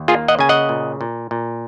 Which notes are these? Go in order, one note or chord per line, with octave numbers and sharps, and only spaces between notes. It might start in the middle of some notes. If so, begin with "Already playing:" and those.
Already playing: D#2
A#3 F4 G#4
D#5 F#5
C#3 G#5
D#5 F#5
A#2
A#2
A#2